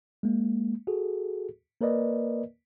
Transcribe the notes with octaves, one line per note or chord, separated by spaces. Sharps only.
G#3 A#3
F#4 G#4 A4
A#3 A#4 B4 D5 D#5